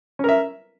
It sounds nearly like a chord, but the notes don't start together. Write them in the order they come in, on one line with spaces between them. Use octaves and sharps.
C#4 A#4 E5